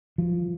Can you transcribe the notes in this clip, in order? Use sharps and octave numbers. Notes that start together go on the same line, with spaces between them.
F3